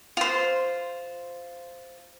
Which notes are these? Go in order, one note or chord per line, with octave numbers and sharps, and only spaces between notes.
F4 C5